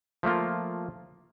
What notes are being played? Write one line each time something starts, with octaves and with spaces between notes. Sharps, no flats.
F3 A3 A#3 F4